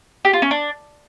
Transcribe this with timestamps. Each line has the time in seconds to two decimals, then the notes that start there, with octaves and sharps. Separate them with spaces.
0.25 G4
0.33 F4
0.42 C#4
0.51 D4